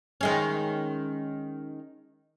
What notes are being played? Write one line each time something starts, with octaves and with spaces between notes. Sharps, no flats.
D#3 G#3 C#4